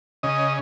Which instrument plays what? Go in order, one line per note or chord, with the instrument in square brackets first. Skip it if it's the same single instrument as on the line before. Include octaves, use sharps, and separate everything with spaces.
[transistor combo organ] C#3 D#5